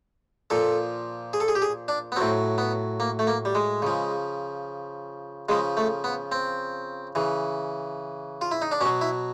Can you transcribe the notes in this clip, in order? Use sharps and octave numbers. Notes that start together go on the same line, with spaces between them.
A#2 F3 A4
G#4
A4
G#4
G4
G#4
D4
B3
A2 F#3 C4
B3
A#3
A3
A#3
G3
G#3
C#3 F3
C#3 F3 G#3
A3
B3
C4
C#3 E3
F4
E4
D#4
D4
B2 F#3 C#4
E4